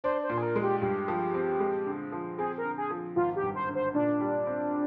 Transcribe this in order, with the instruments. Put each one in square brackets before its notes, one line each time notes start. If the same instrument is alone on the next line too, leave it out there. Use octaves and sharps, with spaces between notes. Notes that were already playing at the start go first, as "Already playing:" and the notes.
[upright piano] D4 [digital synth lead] C5
[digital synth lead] C5
[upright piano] A#2
[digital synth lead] G#4
A#4
[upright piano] G#3
[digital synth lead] G4
[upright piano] G2 [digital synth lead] G4
[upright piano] F3
C4
G#3
D3
F3
[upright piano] C4 [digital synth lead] G#4
[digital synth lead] A#4
[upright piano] D3
[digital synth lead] G#4
[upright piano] F3
[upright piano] G#1 [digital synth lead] F4
[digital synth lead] G4
[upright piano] G2
[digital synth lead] C5
[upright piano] D3
[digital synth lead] C5
[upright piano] A#2 [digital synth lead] D4
[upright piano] G3
C4